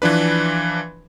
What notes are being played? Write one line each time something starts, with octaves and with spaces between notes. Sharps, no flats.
E3 F3 D4 B4